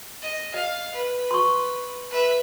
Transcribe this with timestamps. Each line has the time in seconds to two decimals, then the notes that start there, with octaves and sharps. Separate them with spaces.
0.22 D#5
0.54 D#5 F5
0.94 B4
1.31 C6 C#6
2.11 B4 E5